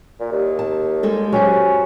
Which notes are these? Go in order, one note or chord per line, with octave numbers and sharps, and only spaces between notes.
A#2
D#2
A5
G3 G#3 A4
F#3 C#4 G4 C5